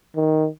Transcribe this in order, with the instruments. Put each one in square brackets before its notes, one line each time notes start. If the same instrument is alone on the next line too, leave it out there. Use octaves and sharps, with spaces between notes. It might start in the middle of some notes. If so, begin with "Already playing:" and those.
[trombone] D#3